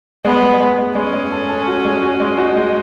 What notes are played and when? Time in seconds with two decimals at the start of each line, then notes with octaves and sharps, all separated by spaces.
0.25 G#3 B3
0.42 G#3
0.60 G#3
0.78 G#3
0.95 G#3 C#4
1.13 G#3
1.32 A4
1.49 A4
1.67 F#4
1.85 G#3
2.02 F#4
2.20 G#3
2.38 D#4 F#4
2.56 G#3